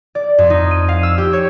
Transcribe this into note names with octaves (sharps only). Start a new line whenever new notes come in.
D5
F2
D#4
D#7
F5
E6
G4
C#5